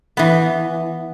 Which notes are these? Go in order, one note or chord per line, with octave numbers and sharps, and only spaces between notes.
E3 B3